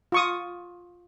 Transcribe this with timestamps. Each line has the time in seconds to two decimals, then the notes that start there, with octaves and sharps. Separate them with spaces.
0.12 F4 C#6 D#6